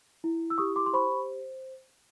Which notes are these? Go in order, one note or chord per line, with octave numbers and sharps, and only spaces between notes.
E4
E6
G4 C#6 D#6
C6 D6
C6
C5 B5 C#6